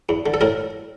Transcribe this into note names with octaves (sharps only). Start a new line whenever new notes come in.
E2
D3
A4
A2 A#4